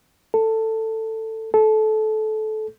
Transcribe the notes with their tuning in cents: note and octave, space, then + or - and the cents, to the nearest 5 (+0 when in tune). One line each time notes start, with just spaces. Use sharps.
A4 +15
A4 -20